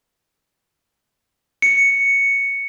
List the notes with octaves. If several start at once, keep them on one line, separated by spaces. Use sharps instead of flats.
C#7